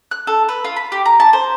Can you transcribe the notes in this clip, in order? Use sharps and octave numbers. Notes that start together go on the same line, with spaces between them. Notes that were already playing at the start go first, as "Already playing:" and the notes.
F#6
A4
B4
F4
B5
G4
A#5
A5
C5